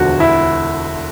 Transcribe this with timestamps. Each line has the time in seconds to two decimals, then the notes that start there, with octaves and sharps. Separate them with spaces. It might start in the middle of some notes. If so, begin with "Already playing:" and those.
Already playing: E1 D2 D3 F3 F#4
0.20 E4